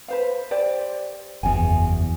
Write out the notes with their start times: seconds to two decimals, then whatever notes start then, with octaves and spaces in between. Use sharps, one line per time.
0.08 B4 C5 F5
0.51 G4 C5 D5
1.43 F#1 E2 G#5